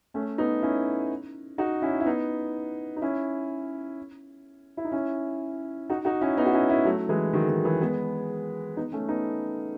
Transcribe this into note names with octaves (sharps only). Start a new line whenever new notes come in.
A3 C#4
B3 D#4
C#4 E4
D#4 F#4
C#4 E4
E4
B3 D#4
D#4
C#4 E4
E4
D#4
C#4 E4
D#4 F#4
D#4 F#4
C#4 E4
B3 D#4
F#4
C#4 E4
C#4 E4
F#3 A3
E3 G#3
D#3 F#3
D#3
E3
G#3 B3
B3 D#4
A3 C#4
B3 D#4